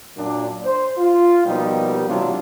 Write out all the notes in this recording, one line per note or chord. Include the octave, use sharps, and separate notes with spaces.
F#2 A#2 D4
C5
F4
B2 F3 G3 A#3 D#4 G4
A1 G#2 C3 F#3 D4 F4